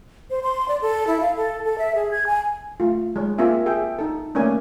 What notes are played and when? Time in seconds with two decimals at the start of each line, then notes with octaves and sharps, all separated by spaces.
0.30 C5
0.43 C6
0.68 D5
0.82 A4
1.07 E4
1.20 F5
1.36 A4
1.65 A4
1.78 E5
1.95 G#4
2.11 G#6
2.27 G#5
2.80 A3 F4
3.16 G#3 C#5
3.38 A#3 C4 F4 G#4 E5 G#5
3.66 G#4 E5 G5
3.99 D#4 A4
4.35 A3 A#3 C#4 D5 G#5